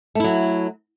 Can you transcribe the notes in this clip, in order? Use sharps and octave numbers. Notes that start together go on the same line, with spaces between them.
F#3 A3 E4